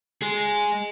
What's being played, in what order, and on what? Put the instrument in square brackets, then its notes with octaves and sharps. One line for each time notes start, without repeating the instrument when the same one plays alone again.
[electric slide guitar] G#3 G#4